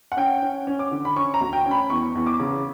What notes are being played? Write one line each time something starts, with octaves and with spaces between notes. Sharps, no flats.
F#5
C#4 G5
C#4
C#4
D6
D3
B5
C#4 C#6
A#5
D2
G5
C#4
B5
E2 C#6
E2
D6
C#3